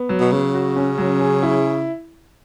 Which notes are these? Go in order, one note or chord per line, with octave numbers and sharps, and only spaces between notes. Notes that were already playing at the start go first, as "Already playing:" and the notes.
Already playing: B3
F#3
B2
C#3 F#3
F#4
C#4
F#3
G#4
E4